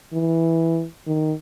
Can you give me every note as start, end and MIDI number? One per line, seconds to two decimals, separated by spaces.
0.13 0.84 52
1.07 1.33 51